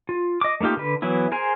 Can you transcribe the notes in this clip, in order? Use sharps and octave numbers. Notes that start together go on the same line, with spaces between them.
F4
D#5 D6
A3 A#3 D#4 F4 G4
D3 B4
E3 F#3 B3 E4
G#4 A#4 C5 G#5